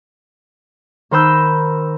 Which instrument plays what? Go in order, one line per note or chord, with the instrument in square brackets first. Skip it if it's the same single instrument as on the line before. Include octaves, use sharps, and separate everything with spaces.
[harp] D#3 A#4 C5 B5 E6 G6